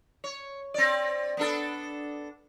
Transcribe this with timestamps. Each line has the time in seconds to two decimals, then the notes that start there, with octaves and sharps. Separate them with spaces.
0.24 C#5
0.74 C4 D5
1.37 B3 D4 A4